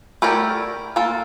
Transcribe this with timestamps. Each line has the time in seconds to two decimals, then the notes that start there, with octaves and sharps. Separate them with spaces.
0.22 A3 E4 G4 A#4 D5
0.96 A#3 F4 A4